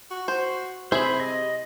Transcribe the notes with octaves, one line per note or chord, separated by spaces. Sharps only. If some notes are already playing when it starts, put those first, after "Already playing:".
F#4
C5
C3 E4 G#4 C5 E5 B5
D#5